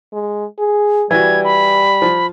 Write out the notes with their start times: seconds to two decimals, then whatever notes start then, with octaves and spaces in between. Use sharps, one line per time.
0.13 G#3
0.59 G#4
1.11 E3 G3 F#4 G#6
1.44 B5
2.02 F3